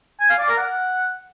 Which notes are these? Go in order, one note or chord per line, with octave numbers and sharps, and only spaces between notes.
G#5
F5
D5
A#4
F#5